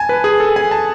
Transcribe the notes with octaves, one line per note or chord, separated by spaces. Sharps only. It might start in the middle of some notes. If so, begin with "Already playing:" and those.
Already playing: G#5 A5
B4
G#4
A4
G#5
A5